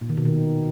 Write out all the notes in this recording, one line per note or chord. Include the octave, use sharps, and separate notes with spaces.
A#2
D#3
B2
D#3